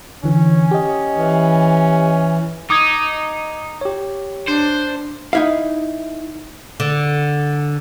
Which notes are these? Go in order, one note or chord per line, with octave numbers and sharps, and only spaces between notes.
D3 E3 C#4
G4 D#5
E3
D#4 D6 D#6 G#6
G4 C#5
D4 C5
D#4 E4 F5
D3